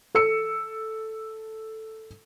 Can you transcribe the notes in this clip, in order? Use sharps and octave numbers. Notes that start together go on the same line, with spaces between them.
A4 E6 C#7